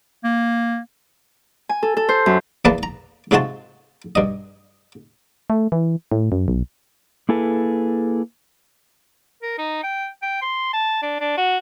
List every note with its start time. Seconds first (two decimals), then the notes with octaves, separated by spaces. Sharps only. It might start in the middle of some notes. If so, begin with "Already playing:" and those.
0.24 A#3
1.69 G#5
1.83 A4
1.97 A4
2.09 C5
2.26 F#2
2.65 E2 E3 A#3 B4 A5
2.83 A#5
3.31 G#2 C3 G#3 F4 F#4 A5
4.15 G2 D#5
5.50 A3
5.72 E3
6.12 A2
6.32 F#2
6.48 B1
7.29 A#3 E4 G#4 A4 B4
9.42 A#4
9.58 D#4
9.83 G5
10.22 G5
10.42 C6
10.73 A5
11.02 D4
11.20 D4
11.37 F#4